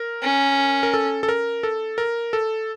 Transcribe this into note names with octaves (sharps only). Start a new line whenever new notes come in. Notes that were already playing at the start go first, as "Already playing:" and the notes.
Already playing: A#4
C#4
A#4
A4
A4
A#4
A4
A#4
A4